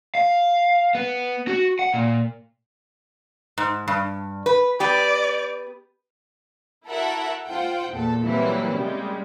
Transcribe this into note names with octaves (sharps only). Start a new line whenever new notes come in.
F5
B3
F#4
F#5
A#2
G#2
G2
B4
B3 G4 D5
E4 F#4 A4 A#4 E5 F#5
F4 C5 F#5 G5
E2 A#2 A4
E3 F#3 G3 A#3 C4 E4
C#3 G3 G#3